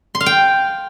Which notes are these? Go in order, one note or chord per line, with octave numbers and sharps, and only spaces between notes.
C6
F5
G5